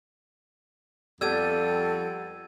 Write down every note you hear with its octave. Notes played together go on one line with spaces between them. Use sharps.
F2 G3 B3 A4 E6 G#6 D#7